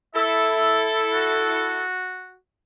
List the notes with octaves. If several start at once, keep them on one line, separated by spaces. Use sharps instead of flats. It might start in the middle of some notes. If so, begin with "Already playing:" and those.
E4 A4 E5
F#4